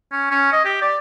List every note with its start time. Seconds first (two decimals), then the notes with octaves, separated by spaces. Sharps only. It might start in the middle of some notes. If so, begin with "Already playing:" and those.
0.12 C#4
0.31 C#4
0.53 D#5
0.65 G4
0.82 D5